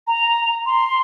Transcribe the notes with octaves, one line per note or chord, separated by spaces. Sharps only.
A#5
C6